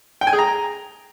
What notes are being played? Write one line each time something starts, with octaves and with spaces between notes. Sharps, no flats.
G5
G#5
G#4
A#5